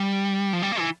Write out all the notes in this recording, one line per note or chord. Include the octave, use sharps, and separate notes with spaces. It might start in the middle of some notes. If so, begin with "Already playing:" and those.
Already playing: G3
F3
G3
A#3
E3